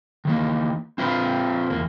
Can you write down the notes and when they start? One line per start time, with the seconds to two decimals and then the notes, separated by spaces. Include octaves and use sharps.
0.25 D#3 E3 A#3
0.98 C4 F4 B4 C5 F5
1.70 E2 A#3